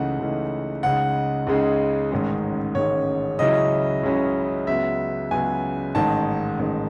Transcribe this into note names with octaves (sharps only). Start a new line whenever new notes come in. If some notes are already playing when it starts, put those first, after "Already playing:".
Already playing: C#2 C#3 E3 A3 D#4 F#5
C#2 C#3 E3 A3 D#4
C#2 C#3 G#3 D#4 F#5
C#2 C#3 G#3 D#4
A1 G#2 D#3 G#3 C#4
A1 G#2 D#3 G#3 C#4 C#5
C#2 C#3 F#3 C#4 E4 D#5
C#2 C#3 F#3 C#4 E4
C#2 C#3 F#3 B3 E5
C#2 C#3 F#3 B3 G#5
A1 G#2 D#3 A5
A1 G#2 D#3